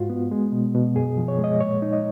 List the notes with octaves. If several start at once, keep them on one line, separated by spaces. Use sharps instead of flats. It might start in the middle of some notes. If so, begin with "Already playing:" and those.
Already playing: G#2 F4 F#4
B3
G#3
B2
B2
F#2 G#4
F3
C#5
G#3
D#5
A#2 C#5
D#4
D#5